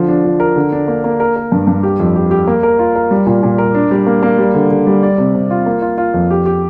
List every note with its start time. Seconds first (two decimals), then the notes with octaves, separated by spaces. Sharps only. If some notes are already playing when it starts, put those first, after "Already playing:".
Already playing: D3 F3
0.08 D4
0.24 F3
0.40 A#4
0.56 D3
0.72 D4
0.88 A#3
1.04 A#3
1.20 A#4
1.36 A#4
1.52 G2
1.67 G2
1.83 G4
2.00 F2
2.16 G4
2.31 G4
2.47 A#3
2.63 A#4
2.79 F4
2.96 A#4
3.11 G3
3.27 A#2
3.43 A#2
3.58 A#4
3.75 D4
3.91 G3
4.07 A#3
4.23 A#3
4.38 G3
4.55 D3
4.71 D3
4.87 G3
5.03 D5
5.18 C3
5.35 C3
5.51 F4
5.66 A#3
5.82 F4
5.98 F4
6.14 F2
6.31 G4
6.46 G4